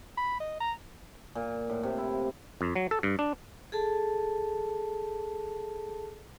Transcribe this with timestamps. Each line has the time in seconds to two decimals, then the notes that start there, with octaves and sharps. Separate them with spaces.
0.17 B5
0.40 D#5
0.60 A#5
1.35 A#2
1.70 A2
1.83 C3
1.98 E4
2.61 F2
2.76 F#3
2.91 A4
3.03 G2
3.19 D4
3.72 G#4 A4 A5